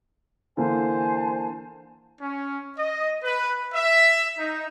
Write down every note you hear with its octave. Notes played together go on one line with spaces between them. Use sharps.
D3 E3 A#3 C5 G#5 A5
C#4
D#5
B4
E5
D#4